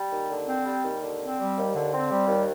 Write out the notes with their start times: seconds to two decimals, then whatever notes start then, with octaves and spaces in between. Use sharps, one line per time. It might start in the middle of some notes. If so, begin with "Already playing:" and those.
Already playing: G3
0.11 D#2
0.29 D3
0.48 C4
0.65 G3
0.83 D#2
1.01 D3
1.20 C4
1.38 G3
1.56 D#2
1.73 D3
1.92 C4
2.09 G3
2.28 D#2